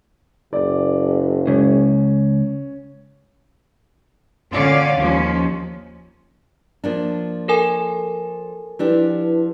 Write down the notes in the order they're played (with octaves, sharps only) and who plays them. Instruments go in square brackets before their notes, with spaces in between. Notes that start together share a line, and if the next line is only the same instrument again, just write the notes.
[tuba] F#1 [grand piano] D5
[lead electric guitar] C#2 [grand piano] C#4
[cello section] A#2 D3 C#4 D5 F5
D#2 F3 C#4
[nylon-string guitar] F3 A#3 D4
[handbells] A4 A#4 G#5
[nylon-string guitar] F3 D4 G4 [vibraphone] E4 B4